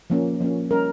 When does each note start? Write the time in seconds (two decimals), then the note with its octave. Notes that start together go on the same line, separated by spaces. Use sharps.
0.10 F3 A#3 C#4
0.40 F3 A#3 C#4
0.71 G3 C#4 A#4